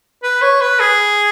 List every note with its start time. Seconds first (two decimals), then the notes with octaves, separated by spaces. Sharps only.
0.23 B4
0.42 C#5
0.61 B4
0.80 G#4